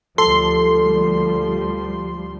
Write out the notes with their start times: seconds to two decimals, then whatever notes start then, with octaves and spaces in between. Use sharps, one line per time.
0.18 D2 F3 G3 A4 C6